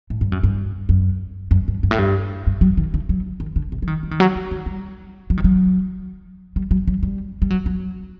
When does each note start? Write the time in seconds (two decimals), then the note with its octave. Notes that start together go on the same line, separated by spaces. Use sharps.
0.10 A2
0.21 G2
0.32 F#2
0.43 G2
0.89 F#2
1.51 F#2
1.68 G2
1.83 G2
1.91 A2
1.99 G2
2.47 G2
2.61 F#3
2.77 D#3
2.94 D3
3.09 F#3
3.40 D#3
3.56 D3
3.72 C3
3.82 F#3
3.87 D#3
4.03 F#3
4.11 D#3
4.20 F#3
4.36 F#3
4.51 D#3
4.66 G3
5.30 F#3
5.37 D#3
5.44 F#3
6.56 G3
6.71 F#3
6.88 F#3
7.03 G3
7.42 G3
7.50 F#3
7.66 F#3